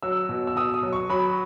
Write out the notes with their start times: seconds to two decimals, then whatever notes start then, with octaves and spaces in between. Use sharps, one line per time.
0.03 F#3 E6
0.29 B2
0.47 E6
0.56 B2 D#6
0.74 D#6
0.83 F#3
0.93 C#6
1.09 F#3 B5